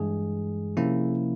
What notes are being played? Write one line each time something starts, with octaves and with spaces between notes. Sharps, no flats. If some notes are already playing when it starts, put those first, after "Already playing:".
Already playing: G2 E3 G#3 G#4
C3 F3 A#3 C#4 E4